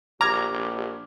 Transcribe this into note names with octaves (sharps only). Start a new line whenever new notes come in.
A#1 G4 A#5 D6 F6 G#6